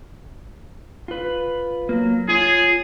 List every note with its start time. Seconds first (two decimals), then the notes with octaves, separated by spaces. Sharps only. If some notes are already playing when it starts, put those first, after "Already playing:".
1.08 F4 B4
1.89 F#3 A#3
2.28 F4 G#4 C#5